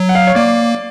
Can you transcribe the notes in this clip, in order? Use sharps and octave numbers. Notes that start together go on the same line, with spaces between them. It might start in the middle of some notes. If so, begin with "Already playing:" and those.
Already playing: F#3
F#5
F5
C#5
A#3 D5